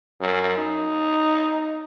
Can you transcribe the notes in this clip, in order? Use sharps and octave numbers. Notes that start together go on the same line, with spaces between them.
F#2
D#4